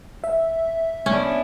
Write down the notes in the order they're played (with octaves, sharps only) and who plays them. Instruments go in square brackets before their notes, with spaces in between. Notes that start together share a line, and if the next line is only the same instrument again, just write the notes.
[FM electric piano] E5
[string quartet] B3 D4 E4 [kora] C#4